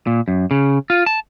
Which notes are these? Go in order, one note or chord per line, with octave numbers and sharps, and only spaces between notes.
A#2
F#2
C#3
F4
A5